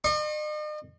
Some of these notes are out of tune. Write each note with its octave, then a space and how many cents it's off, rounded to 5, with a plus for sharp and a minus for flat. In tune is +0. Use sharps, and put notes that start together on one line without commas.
D#5 -45 C#6 -45